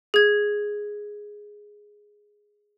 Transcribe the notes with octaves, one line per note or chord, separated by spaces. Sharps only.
G#4 G#6